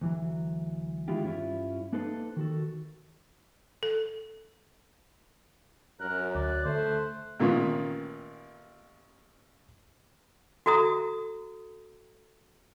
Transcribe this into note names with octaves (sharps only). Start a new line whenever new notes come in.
D2 E3 F#3
D#3 E3 G#3 E4 F4 G4
G2 C#4 E4 F4
A#3 D4 D#4 A4 B4 C5
D#3 F#4 A4
A4
F#2 A#4 F#6
D2 D5 F#6
D3 A3 C5
A1 A#2 D#3 B3 C#4
F#4 A4 A#5 D#6